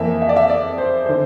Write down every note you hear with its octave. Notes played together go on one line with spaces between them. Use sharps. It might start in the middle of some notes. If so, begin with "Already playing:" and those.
Already playing: F2 E3 A#3 E5
E5
D5
E5
D5
C5
D3 C5